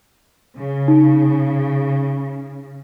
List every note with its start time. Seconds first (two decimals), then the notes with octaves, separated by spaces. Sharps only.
0.58 C#3
0.88 D#4